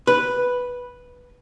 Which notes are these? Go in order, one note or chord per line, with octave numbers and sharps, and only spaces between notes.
B4